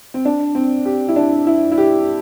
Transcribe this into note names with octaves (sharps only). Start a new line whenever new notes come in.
C4
D4
C4
G4
E4
D4
E4
E4
G4